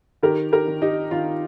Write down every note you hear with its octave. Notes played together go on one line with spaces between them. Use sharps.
D#3 G4 A#4
G4 A#4
D#3
D#4 G4
D#3 F4